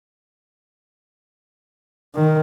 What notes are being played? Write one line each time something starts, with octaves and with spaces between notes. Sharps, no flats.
D#3